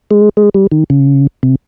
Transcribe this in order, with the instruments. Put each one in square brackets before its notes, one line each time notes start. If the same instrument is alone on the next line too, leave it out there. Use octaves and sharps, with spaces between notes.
[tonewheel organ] G#3
G#3
G3
D#3
C#3
C3